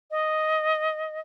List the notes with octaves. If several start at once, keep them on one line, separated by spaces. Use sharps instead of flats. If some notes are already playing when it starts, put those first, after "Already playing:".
D#5